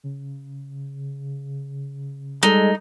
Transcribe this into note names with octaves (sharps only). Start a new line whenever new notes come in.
C#3
G3 G#3 D#4 A4